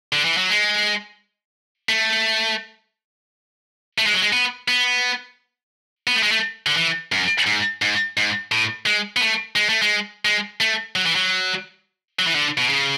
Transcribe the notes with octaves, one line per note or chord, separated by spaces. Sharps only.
D3
E3
F#3
G#3
A3
A3
G#3
F#3
G#3
B3
B3
B3
A3
G#3
A3
D3
E3
F#2
G#2
G#2
G#2
A2
G#3
B3
A3
G#3
A3
G#3
G#3
A3
F#3
E3
F#3
F#3
E3
D3
B2
C#3